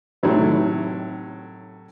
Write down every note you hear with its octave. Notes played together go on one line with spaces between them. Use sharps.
A2 C3 D#3 F#3 E4